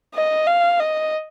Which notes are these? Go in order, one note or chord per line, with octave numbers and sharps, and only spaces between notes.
D#5
F5
D#5